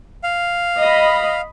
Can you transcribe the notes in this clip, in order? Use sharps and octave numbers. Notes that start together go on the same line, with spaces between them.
F5
D#5 B5